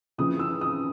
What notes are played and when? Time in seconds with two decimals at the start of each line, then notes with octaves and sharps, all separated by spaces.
0.18 F2 C#3 E3 D#6
0.39 E6
0.61 D#6